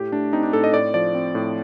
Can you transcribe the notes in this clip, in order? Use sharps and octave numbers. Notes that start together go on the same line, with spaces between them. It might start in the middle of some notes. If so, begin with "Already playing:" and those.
Already playing: A2 G4
A3 D4
C4 D#4
D4
A2 A4
D#5
A2 D5
F3 D5
C4
A2